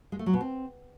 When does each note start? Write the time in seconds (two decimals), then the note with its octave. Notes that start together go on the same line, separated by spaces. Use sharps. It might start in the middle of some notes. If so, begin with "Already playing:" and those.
0.12 G#3
0.19 A3
0.26 F#3
0.33 B2
0.41 C4